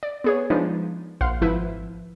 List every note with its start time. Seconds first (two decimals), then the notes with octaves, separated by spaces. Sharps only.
0.03 D5
0.24 B3 G#4 C#5
0.50 F3 G#3 D4 D#4 F4 B4
1.21 A#1 F5 F#5 C6
1.41 G#1 F3 E4 B4